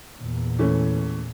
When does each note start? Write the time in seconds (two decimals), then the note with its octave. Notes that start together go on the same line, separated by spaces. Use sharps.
0.18 E2 A#2
0.59 E3 A3 C#4